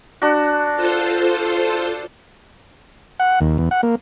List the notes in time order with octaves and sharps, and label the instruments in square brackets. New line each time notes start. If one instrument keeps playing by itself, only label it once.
[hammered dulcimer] D4 F#4
[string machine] F4 A4 C5
[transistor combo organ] F#5
D#2
E2
F#5
A#3